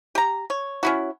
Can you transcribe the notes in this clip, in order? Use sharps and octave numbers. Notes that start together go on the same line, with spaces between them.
G4 A#5
C#5
C#4 E4 F#4